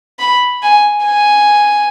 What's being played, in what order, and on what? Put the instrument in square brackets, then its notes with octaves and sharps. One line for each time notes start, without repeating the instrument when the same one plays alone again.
[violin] B5
G#5
G#5